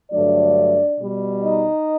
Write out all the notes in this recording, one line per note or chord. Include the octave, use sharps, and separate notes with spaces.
G2 D3 F#3 A3 D4 D5
B2 G3
D#4 D#5